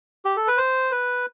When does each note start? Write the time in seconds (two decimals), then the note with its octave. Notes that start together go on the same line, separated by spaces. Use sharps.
0.25 G4
0.37 A4
0.48 B4
0.57 C5
0.91 B4